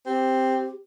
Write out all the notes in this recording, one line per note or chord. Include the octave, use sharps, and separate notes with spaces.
C4 G4